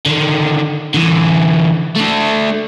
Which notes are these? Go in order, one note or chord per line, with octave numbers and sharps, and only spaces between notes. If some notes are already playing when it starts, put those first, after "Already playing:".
D3 D#3
D3 E3
A3 D4